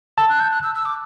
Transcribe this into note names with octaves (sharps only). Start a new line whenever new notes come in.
A5 E6
F#6
G6
F#6
E6
E6
D6